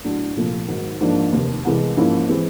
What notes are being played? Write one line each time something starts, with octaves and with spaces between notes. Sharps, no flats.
A2 F#3 A3 D4
C2 A#2 F3 A3
G#2 D#3 F#3
G#2 F3 A#3 D4
F1 D#2 D#3
C2 C3 E3 G#3
G#2 F3 A#3 C#4 E4
E3 G#3 C4